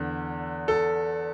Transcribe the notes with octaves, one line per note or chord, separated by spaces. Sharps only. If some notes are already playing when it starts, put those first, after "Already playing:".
Already playing: E2 D3
A4